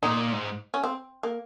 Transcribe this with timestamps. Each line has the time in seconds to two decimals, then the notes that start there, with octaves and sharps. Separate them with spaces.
0.03 A#2 D#4
0.33 G#2
0.74 C#4
0.84 C4
1.23 A#3